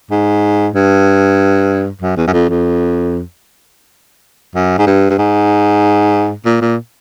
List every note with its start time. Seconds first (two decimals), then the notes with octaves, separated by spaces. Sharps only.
0.11 G#2
0.74 G2
2.01 F#2
2.17 E2
2.27 F#2
2.33 F2
2.49 F2
4.55 F#2
4.78 G#2
4.87 G2
5.10 G2
5.19 G#2
6.46 A#2
6.62 A#2